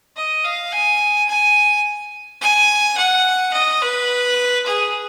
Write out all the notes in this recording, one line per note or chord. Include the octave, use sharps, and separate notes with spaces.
D#5
F5
G#5
G#5
G#5
F#5
D#5
B4
G#4